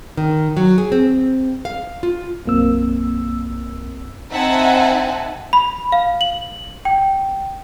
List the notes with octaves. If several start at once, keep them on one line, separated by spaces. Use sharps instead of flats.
D#3
F#3
G#4
C4
F5
F4
B1 F#2 A#3 C4 E6
C4 D#4 E5 F#5 G#5 A5
B5
F5
F#7
G5